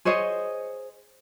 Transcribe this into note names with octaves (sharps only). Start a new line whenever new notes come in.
G#4 C5 C#5 D#5